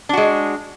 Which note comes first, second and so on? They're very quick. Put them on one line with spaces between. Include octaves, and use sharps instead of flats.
D4 F#4 G#3